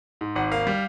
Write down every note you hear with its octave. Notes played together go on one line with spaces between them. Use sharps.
G#2
G#1 F#5
A#3 F5
G3